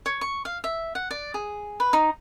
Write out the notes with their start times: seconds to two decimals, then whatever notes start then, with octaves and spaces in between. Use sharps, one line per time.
0.06 C#5
0.21 C#6
0.45 F5
0.64 E5
0.95 F#5
1.11 D5
1.34 G#4
1.80 B4
1.93 D#4